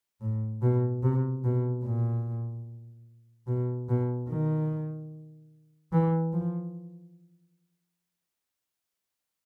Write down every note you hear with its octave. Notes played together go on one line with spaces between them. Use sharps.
A2
B2
C3
B2
A#2
B2
B2
D#3
E3
F3